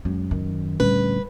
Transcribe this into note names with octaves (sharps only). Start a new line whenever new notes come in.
F#2 G#3
D#3
D2 A#2 G3 C#4 B4